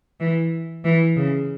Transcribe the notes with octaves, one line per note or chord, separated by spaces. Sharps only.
E3
E3
C#3